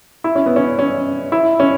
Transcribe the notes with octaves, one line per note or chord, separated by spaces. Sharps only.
E4
C#4
B3
C#4
C#4
E4
C#4